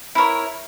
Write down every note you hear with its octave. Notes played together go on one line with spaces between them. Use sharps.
E4 A#4 C#5